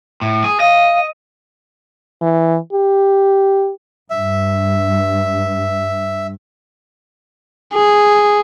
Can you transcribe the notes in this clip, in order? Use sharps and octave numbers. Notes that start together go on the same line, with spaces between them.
A2
G#4
D#5 F5
E3
G4
G2 E5
G#4